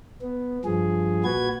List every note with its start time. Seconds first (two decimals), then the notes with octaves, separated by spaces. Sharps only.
0.22 B3
0.65 G2 F3 G#4
1.24 A#2 F#4 B4 G#6